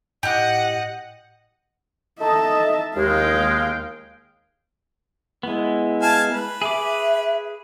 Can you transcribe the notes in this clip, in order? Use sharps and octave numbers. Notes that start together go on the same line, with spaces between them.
A2 G4 D#5 F#5 F#6
D#4 A4 D#5 E5 A5
D#2 G#3 F5 G5
G#3 B3 E4
F5 G#5 A5
B4
G#4 E5 D6